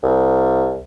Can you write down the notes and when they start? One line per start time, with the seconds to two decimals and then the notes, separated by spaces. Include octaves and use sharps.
0.03 C2